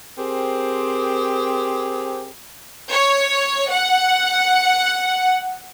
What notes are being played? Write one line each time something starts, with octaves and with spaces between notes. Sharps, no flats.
C4 G4 G#4 A#4 C5
C#5
F#5